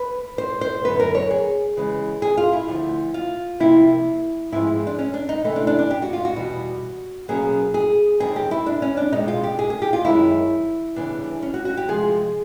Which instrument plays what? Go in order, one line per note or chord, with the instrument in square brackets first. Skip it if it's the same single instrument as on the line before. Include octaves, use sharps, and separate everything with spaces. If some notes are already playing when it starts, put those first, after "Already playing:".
Already playing: [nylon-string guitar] B4
C5
C5
F#2 D3 F#3 B3 B4
A#4
C#5
G#4
C#3 E3 G#3
G#4
F4
E4
D2 D3 F3
F4
C3 F3 A#3 E4
G#2 F3 G#3 C4 E4
D4
C#4
D4
D#4
C3 E3 A3 C4
D4
D4
D4
G4
F#4
F4
F#4
E2 B2 G3
B2 F#3 A#3 C#4 G#4
G#4
D#2 D#3 G3 C4 G#4
G4
E4
D4
C#4
D4
B2 G#3 C4 D#4
F4
G4
G#4
G#4
G4
F4
F#2 D#3 G#3 E4
C#3 E3 G3 B3 D4
C#4
F#4
F#4
G4
C3 F3 G#3 G#4